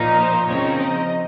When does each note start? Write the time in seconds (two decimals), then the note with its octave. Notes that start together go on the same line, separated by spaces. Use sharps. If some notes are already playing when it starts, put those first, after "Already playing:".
Already playing: A#2 F3 A#3 D#4
0.18 C5
0.48 C#3 F3 C4 D#4 C#5
0.78 D#5